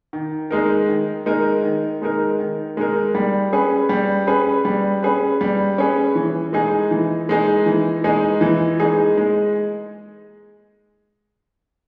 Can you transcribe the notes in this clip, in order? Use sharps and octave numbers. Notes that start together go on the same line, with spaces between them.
D#3
G#3 D#4 A#4
D#3
G#3 D#4 A#4
D#3
G#3 D#4 A#4
D#3
G#3 D#4 A#4
G3
C#4 G#4 B4
G3
C#4 G#4 B4
G3
C#4 G#4 B4
G3
C#4 G#4 B4
E3
G#3 D#4 G#4
E3
G#3 D#4 G#4
E3
G#3 D#4 G#4
E3
G#3 D#4 G#4
G#3